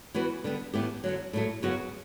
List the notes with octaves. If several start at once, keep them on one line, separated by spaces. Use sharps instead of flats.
E3 B3 F#4 B4
D3 G3 B3
A2 E3 B3 E4 G4
F#2 D3 F#3
A2 F#3 A3
F#2 C#3 F#3 B3 F#4